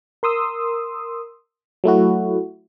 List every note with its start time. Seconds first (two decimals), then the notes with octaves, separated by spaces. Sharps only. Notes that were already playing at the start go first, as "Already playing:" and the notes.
0.23 A#4 C6 D#6 E6
1.84 F#3 A3 E4 F#4